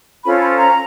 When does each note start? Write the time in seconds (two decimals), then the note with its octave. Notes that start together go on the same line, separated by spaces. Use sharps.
0.24 C#4 F4 A4 C5 B5
0.41 B5
0.58 A#5